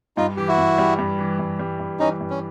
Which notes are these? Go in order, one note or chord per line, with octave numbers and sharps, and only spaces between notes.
G2 D#4 F4
E3 G4
E4 F#4
G2
G3
G2
E3
G2
G3
G2
E3 C#4 D#4
G2
C#4